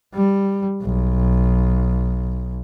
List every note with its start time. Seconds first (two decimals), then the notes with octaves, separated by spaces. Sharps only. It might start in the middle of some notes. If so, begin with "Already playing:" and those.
0.14 G3
0.82 B1